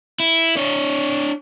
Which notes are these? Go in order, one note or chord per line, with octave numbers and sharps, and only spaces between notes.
E4
D4 C#5